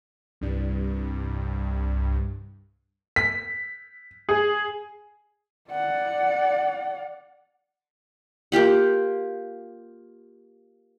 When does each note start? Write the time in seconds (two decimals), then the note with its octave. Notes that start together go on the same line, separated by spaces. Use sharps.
0.41 C2 G2
3.16 B6
4.29 G#4
5.71 D5 F#5
8.52 A#3 F4 G4 F#5